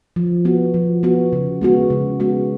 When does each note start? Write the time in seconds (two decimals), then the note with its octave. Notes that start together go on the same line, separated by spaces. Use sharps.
0.16 F3
0.45 B3 F#4
0.74 F3
1.03 B3 F#4
1.33 C#3
1.61 G#3 B3 F#4
1.90 C#3
2.20 G#3 B3 F#4